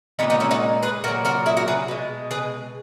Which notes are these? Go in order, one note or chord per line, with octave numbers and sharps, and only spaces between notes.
A#2 G#3 B3 D#4
B3 D#4
C#4 E4
D#4 F#4
G#4 B4
A#2 F#3 F#4 A#4
F#4 A#4
E4 G#4
F#4 A#4
G#4 B4
B2 G#3
G#4 B4